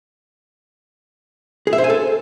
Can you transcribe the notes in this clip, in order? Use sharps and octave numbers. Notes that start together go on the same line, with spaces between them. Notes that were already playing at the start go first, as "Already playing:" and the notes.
G#4
E5
C5
G#5
A4